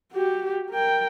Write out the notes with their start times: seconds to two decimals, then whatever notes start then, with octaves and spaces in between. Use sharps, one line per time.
0.12 F#4 G4
0.70 A#4 G5